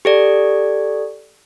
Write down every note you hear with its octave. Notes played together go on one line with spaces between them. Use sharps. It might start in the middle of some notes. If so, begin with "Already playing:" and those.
G4 A4 D5